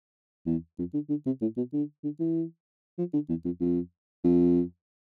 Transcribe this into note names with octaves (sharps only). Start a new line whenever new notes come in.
E2
F2
D3
D3
C3
A2
B2
D3
D3
E3
F3
D3
E2
F2
F2
F2